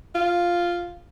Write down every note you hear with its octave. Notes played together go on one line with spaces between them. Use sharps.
F4